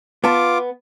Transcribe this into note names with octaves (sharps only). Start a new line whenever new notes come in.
B3 F4 A5 D6